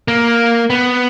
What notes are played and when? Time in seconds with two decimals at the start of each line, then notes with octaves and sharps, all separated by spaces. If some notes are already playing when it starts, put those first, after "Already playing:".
0.08 A#3
0.70 B3